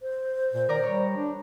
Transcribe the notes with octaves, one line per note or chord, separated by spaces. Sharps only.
C5
A#2
D#3 A#4 D5 A#5
G3 C#5
D4